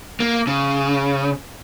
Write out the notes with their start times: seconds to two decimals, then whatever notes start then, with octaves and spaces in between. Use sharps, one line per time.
0.20 A#3
0.47 C#3